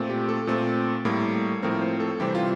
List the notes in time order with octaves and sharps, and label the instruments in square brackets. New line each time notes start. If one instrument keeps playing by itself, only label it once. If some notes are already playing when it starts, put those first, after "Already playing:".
Already playing: [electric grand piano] A#2 A3 C4
G4
A4
A#2 A3 C4
A2 G3 A#3
A2 F3 C4 A#4
C5
A4
C3 E3 G3 C4 G4
F4